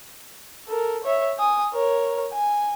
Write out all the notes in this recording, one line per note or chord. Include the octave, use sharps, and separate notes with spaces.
A4 A#4
C#5 E5
G#5 D#6
A#4 C#5
G#5